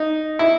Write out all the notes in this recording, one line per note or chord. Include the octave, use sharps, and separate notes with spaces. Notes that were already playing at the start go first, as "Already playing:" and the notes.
Already playing: D#4
E4